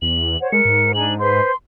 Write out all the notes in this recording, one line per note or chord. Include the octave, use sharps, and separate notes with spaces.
E2 F#7
C5 C#5 F#5
G#3 A#4 C#7
G#2
D4 D#4 G#5 F#7
B4 C5 C6